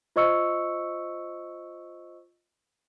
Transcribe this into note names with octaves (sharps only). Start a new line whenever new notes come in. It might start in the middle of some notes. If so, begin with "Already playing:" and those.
F4 C5 D#5 C#6 E6 C#7